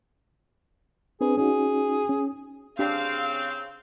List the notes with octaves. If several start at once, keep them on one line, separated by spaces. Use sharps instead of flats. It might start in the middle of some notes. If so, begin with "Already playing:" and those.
C4 D4 G#4 B4
C#4 D#4 F#4 G#4
C#4
C#3 C4 D4 G4 F5